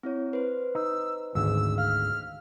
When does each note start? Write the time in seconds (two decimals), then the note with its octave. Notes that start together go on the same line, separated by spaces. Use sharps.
0.03 C4 E4 C#5
0.33 B4 C5
0.75 D#4 E6
1.35 G#1 D2 G#2 E6
1.78 F5 F6